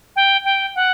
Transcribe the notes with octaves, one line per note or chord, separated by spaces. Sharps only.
G5
G5
F#5